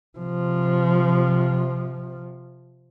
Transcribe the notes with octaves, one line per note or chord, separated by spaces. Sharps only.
C3 F3